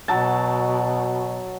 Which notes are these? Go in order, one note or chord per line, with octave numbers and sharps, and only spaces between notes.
B2 F#3 A5